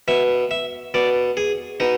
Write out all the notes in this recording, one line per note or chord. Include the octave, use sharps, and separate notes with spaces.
B2 E5
E5
B2 D5
G#4
B2 D#4